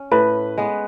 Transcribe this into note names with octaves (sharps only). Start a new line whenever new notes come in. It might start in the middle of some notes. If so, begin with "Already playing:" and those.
Already playing: C#4
A2 B4
G#3 B3